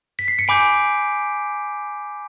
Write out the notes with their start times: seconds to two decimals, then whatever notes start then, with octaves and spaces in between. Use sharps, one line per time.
0.19 B6
0.28 C7
0.39 C#7
0.48 G#5 B5 D6 G6 D7